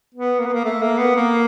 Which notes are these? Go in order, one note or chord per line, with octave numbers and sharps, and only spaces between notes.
B3
A#3
B3
A#3
A3
A#3
B3
A#3